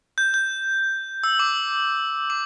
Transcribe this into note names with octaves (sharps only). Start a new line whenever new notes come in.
G6
G6
E6
D6
D6